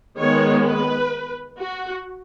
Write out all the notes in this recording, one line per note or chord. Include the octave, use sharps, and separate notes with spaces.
D#3 G#3 B3 C#5
B4
F#4